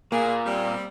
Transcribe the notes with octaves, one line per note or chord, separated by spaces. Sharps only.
A#2 A#3 G#4 B4
G3 C4